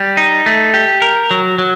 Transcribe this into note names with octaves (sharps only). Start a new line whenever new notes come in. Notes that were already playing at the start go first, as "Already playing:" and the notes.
Already playing: G3
D#4
A3
G4
A#4
F#3
F#3